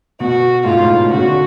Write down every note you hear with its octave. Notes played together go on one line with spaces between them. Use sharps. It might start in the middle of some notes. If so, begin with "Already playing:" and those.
B2 F#4
G#2 F4
A2
B2
C#3 F#4
D3